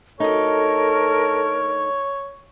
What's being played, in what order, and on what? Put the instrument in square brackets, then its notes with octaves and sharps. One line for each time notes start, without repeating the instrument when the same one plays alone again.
[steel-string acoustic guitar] D2 D#4 [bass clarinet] A4 [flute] A#4 [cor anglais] C#5